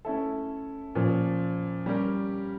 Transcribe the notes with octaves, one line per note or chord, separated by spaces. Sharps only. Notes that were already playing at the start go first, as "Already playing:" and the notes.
A3 C#4 E4 A4
A#2 F3 C#4
G3 C#4 G4 A#4